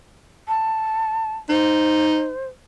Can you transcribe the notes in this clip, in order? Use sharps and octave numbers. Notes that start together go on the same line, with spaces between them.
A5
D#4 C5